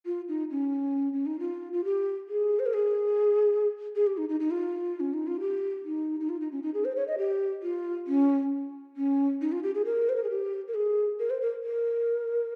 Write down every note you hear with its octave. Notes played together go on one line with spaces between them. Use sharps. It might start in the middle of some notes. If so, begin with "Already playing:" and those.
F4
D#4
C#4
C#4
D#4
F4
F4
G4
G#4
C5
A#4
G#4
G#4
G4
D#4
D#4
D#4
F4
C#4
D#4
F4
G4
D#4
D#4
F4
D#4
C#4
D#4
G#4
C5
C#5
D#5
G4
F4
C#4
C#4
D#4
F4
G4
G#4
A#4
C5
A#4
G#4
G4
A#4
G#4
A#4
C5
A#4
A#4